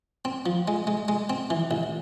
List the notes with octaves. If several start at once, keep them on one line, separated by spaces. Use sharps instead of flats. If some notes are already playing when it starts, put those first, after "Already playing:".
C4
F3
G#3
G#3
G#3
C4
E3
A1